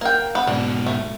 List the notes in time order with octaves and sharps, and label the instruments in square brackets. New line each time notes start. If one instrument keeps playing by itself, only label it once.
[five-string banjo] A#3 G5
B3
[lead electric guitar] G#2 B2 [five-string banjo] D4
[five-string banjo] A3